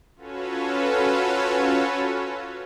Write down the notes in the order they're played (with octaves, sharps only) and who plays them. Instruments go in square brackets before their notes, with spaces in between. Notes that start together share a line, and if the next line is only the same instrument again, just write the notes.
[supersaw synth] C#4 F4 F#4 A4 B4 C#5